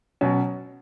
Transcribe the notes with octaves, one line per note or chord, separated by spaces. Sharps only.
B2 F#3 C#4